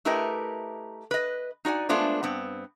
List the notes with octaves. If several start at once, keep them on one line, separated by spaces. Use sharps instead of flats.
A3 E4 G4 A#4 B4 D#5
B4 D#5
D#4 F#4 D5 G#5
G#3 A3 B3 D4 F4 C5
G2 B3 C4